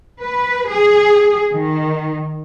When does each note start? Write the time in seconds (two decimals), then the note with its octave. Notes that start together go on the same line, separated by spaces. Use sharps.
0.22 B4
0.70 G#4
1.54 D#3